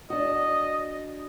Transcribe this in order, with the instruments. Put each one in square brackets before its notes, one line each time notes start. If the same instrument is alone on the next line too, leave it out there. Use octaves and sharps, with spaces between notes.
[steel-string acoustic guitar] D4 F#4 [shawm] D#5